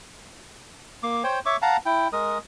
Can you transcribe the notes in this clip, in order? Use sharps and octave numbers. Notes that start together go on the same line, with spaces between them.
A#3 D6
C5 C#5 G5
C#5 E5 C#6 D6
F5 F#5 A5 A#5
E4 G5
G#3 A#4 D#6